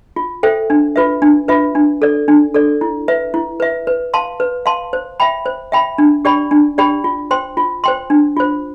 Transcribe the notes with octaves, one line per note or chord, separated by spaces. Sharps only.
F4
A4 C5 E5 G5
D4
F4 B4 E5
D4
F4 B4 E5
D4
A4 D5
D4
A4 D5
E4
B4 E5
E4
B4 E5
B4
F5 A5 C6
B4
F5 A5 C6
C5
E5 G5 B5
C5
E5 G5 B5
D4
G4 D5 G5 B5
D4
G4 D5 G5 B5
F4
C5 G5 C6
F4
C5 G5 C6
D4
F4 C5